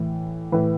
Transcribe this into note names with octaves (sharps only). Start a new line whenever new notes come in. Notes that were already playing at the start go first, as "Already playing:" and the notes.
Already playing: A2 E3
A2 E3 B4